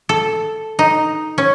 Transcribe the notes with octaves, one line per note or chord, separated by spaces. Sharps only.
A4
D#4
C#4